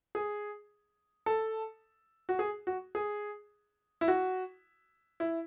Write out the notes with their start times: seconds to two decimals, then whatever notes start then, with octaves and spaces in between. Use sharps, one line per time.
0.15 G#4
1.26 A4
2.29 F#4
2.39 G#4
2.67 F#4
2.95 G#4
4.01 E4
4.08 F#4
5.20 E4